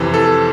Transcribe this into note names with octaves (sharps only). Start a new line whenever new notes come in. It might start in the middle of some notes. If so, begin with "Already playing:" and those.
Already playing: F2 C3 E3
A4